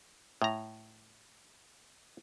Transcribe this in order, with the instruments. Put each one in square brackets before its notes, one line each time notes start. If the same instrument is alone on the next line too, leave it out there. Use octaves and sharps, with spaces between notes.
[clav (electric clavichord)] A2 A#5